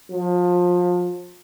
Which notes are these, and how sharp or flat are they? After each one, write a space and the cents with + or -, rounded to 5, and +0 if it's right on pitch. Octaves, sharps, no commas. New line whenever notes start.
F3 +30